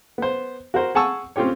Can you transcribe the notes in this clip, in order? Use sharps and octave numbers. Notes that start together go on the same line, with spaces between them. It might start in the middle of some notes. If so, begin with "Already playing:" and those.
B3 C5
F#4 A#4 C5
G#4 F#5 G#5 A5 C#6 E6
C4 C#4 F4 G4 C#5